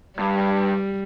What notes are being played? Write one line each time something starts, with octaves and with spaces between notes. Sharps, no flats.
G2 G3